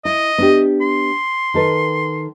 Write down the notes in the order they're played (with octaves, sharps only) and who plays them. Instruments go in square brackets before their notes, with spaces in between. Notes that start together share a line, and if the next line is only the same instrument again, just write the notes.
[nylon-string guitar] E4 [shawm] D#5
[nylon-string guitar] B3 D4 G4
[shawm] C6
[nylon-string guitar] D#3 A4 B4